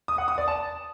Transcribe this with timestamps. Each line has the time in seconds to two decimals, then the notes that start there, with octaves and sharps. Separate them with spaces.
0.08 D#6
0.18 F#5
0.28 D#6
0.38 D5
0.48 A5